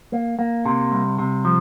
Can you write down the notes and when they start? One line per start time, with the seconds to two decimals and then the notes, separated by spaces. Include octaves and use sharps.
0.12 A#3
0.39 A#3
0.66 C3
0.92 C2
1.18 C3
1.45 F3